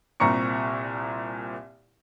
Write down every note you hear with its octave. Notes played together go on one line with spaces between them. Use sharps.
C2 A#2 C4 A#5 C#6 C#7